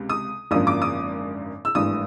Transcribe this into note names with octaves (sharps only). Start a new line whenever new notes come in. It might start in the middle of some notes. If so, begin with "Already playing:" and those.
Already playing: C#2 C3
D#6
G#1 F#2 D3 F3 A#3 D#6
D6
D#6
E6
G#1 G2 E3 A3 D#6